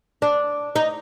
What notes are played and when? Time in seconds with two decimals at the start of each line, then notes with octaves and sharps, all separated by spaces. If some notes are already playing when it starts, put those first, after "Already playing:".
0.22 D4
0.76 D#4